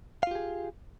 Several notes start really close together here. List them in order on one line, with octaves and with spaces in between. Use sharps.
F5 F4 G4 G#4